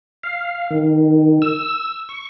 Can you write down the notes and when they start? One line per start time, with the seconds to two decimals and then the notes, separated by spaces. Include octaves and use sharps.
0.23 F5
0.71 D#3
1.42 E6
2.09 C#6